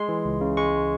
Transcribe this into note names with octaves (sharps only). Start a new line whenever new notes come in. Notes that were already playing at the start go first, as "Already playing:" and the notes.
Already playing: G#3 C6
E3
C#2
C#3
G#3 C#6